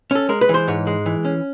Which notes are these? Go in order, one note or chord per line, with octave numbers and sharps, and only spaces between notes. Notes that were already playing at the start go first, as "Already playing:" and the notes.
C#4 A4
G#3 A#4
B4
E3
C5
G#2 C#5
G#3
E3
C#4